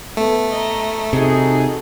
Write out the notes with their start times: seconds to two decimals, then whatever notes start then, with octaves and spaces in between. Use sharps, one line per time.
0.17 A3 B3 A4
0.52 D#5 A#5
1.13 C3 D#4 F#4 G#4 A4